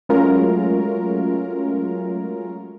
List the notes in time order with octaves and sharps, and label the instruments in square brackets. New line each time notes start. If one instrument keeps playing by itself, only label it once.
[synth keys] F#3 G#3 A3 C#4 F4 A#4